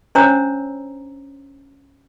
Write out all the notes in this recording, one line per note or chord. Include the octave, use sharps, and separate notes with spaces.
C#4 D4 C5 C#5 A#5 E6